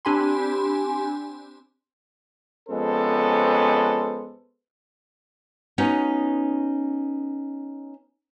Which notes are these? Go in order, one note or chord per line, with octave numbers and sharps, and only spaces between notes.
C4 D4 G4 G#5 B5 C6
F2 G#3 B3 C#4 A4 C5
B3 C#4 D#4 F#4